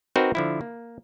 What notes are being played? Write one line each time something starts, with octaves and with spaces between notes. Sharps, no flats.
C4 D#4 F#4 A#4 B4
D3 F3 E4
A#3